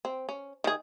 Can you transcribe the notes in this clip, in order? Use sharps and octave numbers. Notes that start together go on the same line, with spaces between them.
C4
C#4
D#3 G#4